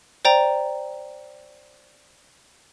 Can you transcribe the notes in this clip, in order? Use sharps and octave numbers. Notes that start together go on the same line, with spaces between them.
C5 D5 G5 A#5